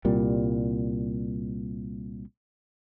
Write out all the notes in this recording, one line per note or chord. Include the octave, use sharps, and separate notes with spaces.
C2 A#2 G3